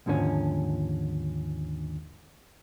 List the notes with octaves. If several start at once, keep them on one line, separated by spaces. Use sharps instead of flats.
D#2 G#2 D3 F3 C#4